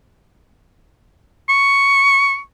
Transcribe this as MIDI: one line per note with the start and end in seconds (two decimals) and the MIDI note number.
1.49 2.41 85